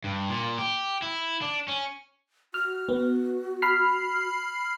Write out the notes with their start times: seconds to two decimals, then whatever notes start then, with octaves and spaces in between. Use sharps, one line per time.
0.04 G2
0.29 A#2
0.58 G4
1.02 E4
1.42 D4
1.68 C#4
2.54 F#4 F6
2.89 B3
3.62 B5 F6 C7